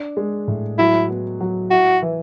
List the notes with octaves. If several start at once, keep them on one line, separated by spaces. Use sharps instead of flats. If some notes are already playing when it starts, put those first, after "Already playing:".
Already playing: D4
G#3
A2
F#3 E4
B3
F#3
E4 F#4
E3